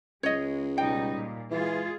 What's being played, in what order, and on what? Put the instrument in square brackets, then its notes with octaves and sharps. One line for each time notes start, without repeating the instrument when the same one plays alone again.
[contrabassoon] C#2 [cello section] G#3 [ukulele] C#5 D#5
[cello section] B2 G3 D#4 [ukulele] G5
[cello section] A#2
[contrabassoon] E3 [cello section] G#3 F4 G#4